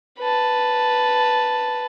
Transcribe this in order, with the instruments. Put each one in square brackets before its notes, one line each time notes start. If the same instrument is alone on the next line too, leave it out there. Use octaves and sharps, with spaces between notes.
[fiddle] B4 A5